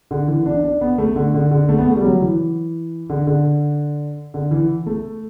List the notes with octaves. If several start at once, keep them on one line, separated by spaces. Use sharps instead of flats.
D3
E3
D4
D4
B3
A3
D3
D3
D3
A3
B3
A3
G3
F#3
E3
D3
D3
D3
E3
A3